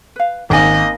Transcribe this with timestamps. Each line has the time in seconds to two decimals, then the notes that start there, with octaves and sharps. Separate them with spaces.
0.16 B4 F5
0.50 G#1 A#3 C#4 D#5 G#5